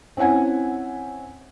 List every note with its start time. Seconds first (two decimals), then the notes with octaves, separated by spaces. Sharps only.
0.17 C4 C#4 E4 F#5 G#5